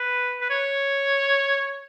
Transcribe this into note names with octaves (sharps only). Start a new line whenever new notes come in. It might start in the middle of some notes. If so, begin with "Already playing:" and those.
Already playing: B4
B4
C#5